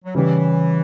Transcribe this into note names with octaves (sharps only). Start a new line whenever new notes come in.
F#3
C#3 E3 G3 C#4 G4